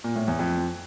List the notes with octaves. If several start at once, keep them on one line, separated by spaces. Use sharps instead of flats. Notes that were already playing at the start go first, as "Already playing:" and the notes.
A#2
A2
E2
F2